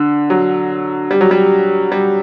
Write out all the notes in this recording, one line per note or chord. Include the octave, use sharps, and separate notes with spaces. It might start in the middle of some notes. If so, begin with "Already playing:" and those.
Already playing: D3
F#3
G3
F#3
G3
G3